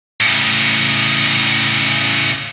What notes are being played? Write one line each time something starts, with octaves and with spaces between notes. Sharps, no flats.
A2 C#3